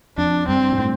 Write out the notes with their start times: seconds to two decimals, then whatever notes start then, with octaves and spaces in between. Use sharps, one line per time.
0.17 F2 D4
0.49 G2 C4
0.72 A#2
0.78 A2